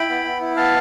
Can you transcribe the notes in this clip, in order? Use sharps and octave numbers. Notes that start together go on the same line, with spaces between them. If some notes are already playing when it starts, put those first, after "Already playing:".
Already playing: E4 G5 B5
B3
B3
E4
B3 F5 A5